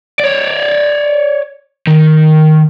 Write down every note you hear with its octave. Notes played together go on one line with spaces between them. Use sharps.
C#5 D5
D#3